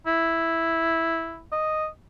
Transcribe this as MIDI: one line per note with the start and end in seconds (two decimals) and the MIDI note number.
0.07 1.43 64
1.52 1.87 75